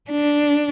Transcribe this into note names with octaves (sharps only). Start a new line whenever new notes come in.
D4